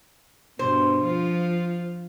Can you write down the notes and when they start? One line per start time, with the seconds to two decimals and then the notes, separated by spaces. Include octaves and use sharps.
0.59 G2 B2 C5
1.03 F3 F4